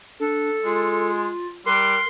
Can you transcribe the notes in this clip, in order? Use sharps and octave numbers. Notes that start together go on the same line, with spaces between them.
D4 A4
G#3 F4
G3 A#4 C6 F#6